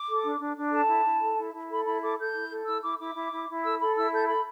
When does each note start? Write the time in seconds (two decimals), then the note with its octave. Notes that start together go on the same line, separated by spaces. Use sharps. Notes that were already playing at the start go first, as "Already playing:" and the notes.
Already playing: D6
0.08 A4
0.24 D4
0.40 D4
0.56 D4
0.72 A4 A5
0.88 E4
1.05 E4
1.21 A4
1.37 E4
1.53 E4
1.70 A4 B5
1.86 E4 B5
2.02 A4 D6
2.18 A4 G6
2.34 E4
2.50 A4
2.66 E4 E6
2.83 E4 D6
2.99 E4 D6
3.15 E4
3.32 E4
3.48 E4
3.63 A4 E6
3.80 A4 B5
3.96 E4 E6
4.12 A4 G6
4.28 A4 B5